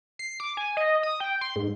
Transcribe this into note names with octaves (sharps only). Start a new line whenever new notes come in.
C7
D6
G#5
D#5
D#6
G5
C6
G#2